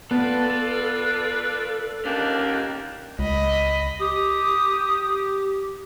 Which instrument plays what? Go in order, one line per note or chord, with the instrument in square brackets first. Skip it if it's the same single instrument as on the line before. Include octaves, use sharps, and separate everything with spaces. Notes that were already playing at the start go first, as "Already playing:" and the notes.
[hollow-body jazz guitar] B3 [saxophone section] F4 B4 D5 [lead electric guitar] A4
[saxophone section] D#2 A#3 D4 [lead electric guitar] D#3 C#4
[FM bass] C#2 [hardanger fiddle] D#5 B5
[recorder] G4 [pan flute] D#6